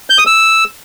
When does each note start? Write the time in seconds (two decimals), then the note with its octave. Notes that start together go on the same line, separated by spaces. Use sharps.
0.10 G6
0.18 D#6
0.27 E6